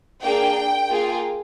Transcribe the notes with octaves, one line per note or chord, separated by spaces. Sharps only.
A#3 D4 G#4 G5
A#3 F4 G#4